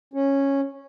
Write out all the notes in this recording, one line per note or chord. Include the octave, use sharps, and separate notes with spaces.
C#4